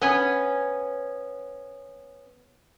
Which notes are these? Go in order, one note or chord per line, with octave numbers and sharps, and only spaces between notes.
B3 C#4